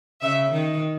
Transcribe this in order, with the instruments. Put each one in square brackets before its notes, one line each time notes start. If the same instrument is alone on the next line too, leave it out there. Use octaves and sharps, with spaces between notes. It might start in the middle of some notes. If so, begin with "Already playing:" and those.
[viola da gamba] C#3 [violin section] E5
[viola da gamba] D#3